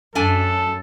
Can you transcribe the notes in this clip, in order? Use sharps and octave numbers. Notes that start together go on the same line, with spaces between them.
F#2 A3 D4 A4 G#5